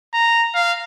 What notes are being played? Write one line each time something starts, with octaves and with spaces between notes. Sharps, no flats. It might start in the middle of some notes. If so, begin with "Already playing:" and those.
A#5
F5